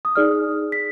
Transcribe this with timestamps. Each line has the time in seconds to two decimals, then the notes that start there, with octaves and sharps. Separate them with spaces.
0.05 D#6
0.16 D#4 G#4 D5 F6
0.72 B6